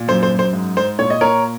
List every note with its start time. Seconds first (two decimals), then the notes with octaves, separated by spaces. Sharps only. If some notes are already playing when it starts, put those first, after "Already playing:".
Already playing: A#2
0.08 F#2 C5
0.23 C5
0.31 F#2
0.39 C5
0.53 G#2
0.77 G#2 C5
0.99 A#2 C#5
1.10 D#5
1.21 A#2 A#4 C#5